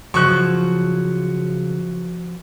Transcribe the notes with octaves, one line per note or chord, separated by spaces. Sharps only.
C#3 F3 F#3 C#6 F#6